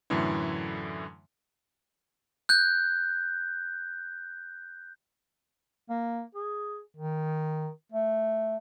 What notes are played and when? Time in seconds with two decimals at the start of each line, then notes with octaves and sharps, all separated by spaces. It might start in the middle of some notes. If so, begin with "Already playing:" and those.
0.10 F#2 A2 D3 E3 E4
2.49 F#6 G6
5.90 A#3
6.35 G#4
6.97 D#3
7.92 A3